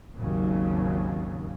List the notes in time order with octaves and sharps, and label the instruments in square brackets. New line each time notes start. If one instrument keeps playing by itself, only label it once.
[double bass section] G#1 D#2 C#3 F#3